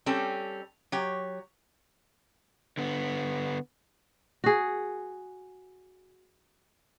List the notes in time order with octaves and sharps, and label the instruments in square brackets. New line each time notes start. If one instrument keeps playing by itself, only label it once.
[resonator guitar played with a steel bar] G3 C4 C#4 A4
F#3 G4 C#5
[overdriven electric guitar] D3 B3
[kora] F#4 G#4